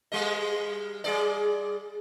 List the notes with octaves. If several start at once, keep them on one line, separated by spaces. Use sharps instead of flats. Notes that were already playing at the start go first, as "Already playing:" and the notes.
G3 G#3 D#5
G3 G#4 D5